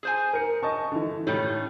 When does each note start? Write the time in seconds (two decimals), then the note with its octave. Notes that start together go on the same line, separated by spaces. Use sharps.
0.03 G#4 C5 G#5
0.33 A#4 C#7
0.63 D#5 A5 C#6
0.92 D3 E3
1.27 A2 D#3 G3 A3 C#4